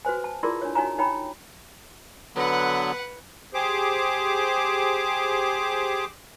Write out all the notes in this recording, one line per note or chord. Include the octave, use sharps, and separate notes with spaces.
F#4 B4 C5 G#5
A5
E4 F4 G#4 A#4 D5 C6
D4 C#5
D#4 F#4 C#5 G#5 A#5
D#4 C#5 G5 A#5 B5
D3 F#3 B3 B4 F#5
G4 G#4 C5 D6